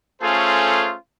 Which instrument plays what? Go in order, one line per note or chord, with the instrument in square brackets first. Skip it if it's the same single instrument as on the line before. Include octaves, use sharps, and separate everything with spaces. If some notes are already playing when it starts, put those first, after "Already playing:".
[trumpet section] A3 C#4 F4 G#4 A4 C5